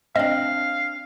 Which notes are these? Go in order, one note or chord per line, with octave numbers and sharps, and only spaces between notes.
C4 D4 D#5 F5